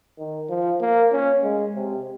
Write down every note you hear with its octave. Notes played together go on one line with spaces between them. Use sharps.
D#3
F3
A#3
C#4
G#3
C3